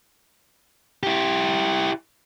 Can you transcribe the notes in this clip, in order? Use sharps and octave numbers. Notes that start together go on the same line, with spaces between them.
E4 G4